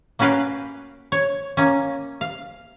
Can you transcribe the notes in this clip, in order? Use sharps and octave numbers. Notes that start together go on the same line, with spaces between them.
A#3 C#4 F#4 B4 F5 G5
C#5
A#3 C#4
F5